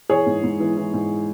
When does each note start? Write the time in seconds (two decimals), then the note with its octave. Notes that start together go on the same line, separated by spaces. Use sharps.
0.09 E3 G#4 C#5
0.26 G#2
0.43 G#2
0.60 E3
0.77 E3
0.93 G#2